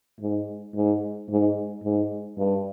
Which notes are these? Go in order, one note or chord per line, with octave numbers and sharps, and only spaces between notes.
G#2
G#2
G#2
G#2
G2